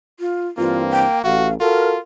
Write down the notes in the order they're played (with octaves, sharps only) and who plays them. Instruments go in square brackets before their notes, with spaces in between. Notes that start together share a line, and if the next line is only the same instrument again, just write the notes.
[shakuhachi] F4
[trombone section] G2 E3 C4 [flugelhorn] A#3 [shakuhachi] F4
[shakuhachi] G5
[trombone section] A1 [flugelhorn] F#4 [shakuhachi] F5
[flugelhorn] F4 [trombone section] F#4 A4 [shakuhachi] A#4